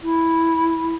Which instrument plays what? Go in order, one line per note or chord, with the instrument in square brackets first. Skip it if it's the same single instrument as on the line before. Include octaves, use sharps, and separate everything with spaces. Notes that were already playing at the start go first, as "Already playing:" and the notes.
[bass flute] E4